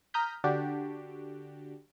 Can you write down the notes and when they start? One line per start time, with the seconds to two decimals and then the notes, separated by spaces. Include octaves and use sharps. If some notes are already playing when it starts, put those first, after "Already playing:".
0.14 A#5 D#6 F6 G6 B6
0.44 D3 D4 F#4 G4